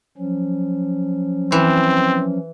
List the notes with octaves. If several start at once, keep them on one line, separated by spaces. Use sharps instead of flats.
F3 F#3 C#4
E3 C4